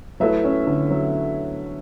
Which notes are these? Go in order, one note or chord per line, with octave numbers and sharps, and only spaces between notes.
F#3 A3 E4 B4 E5
C#4
D3
F#3